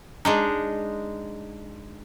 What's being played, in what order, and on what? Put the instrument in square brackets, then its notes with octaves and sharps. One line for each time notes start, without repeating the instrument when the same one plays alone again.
[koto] G#3 D4 D#4